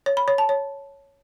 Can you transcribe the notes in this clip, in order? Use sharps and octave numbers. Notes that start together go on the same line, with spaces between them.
C#5
B5
C#5
A5
C#5